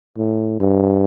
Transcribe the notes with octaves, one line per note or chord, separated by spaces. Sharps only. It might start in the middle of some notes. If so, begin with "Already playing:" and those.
A2
G2